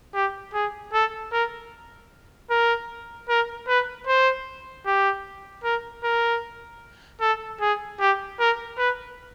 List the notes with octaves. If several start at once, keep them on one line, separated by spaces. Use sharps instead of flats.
G4
G#4
A4
A#4
A#4
A#4
B4
C5
G4
A#4
A#4
A4
G#4
G4
A#4
B4